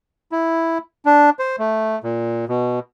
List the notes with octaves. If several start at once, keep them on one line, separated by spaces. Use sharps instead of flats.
E4
D4
C5
A3
A#2
B2